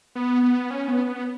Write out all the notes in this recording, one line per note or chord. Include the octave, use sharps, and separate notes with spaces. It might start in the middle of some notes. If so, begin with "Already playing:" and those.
B3
B3
C#4
B3
B3